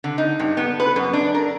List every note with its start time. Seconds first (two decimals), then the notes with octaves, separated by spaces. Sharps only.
0.04 D3
0.18 D#4
0.40 G2
0.57 B3
0.80 B4
0.96 F#2
1.13 D4
1.34 A#4